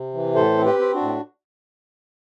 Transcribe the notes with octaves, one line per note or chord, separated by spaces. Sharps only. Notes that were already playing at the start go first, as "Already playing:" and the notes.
Already playing: C3
E3
A2 A4 C5
C4
G4 B4
C4
D4 F#4
A2